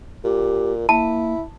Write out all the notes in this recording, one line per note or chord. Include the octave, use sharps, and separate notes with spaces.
A#2 G4
A#3 E4 A5